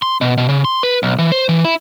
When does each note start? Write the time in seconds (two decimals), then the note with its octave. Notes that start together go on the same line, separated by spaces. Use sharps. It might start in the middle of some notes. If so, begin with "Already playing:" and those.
0.02 C6
0.21 B2
0.38 B2
0.49 C#3
0.65 C6
0.83 B4
1.03 B1
1.18 E3
1.32 C5
1.49 E3
1.64 E4